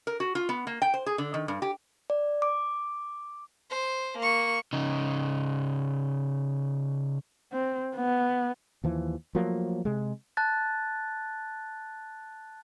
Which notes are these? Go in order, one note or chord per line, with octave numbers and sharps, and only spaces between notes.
A#4
F#4
F4
B3
A#3
G5
C5
G#4
D3
D#3
G2
G4
D5
D6
C5
A#3 C#6
C#3 D#4
C4
B3
D#2 E3 F3
F3 F#3 A3 A#3
C3 G#3
A5 F#6 A6